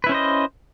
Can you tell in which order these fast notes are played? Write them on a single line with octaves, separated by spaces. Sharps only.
B4 E4 C#4 C5 D#5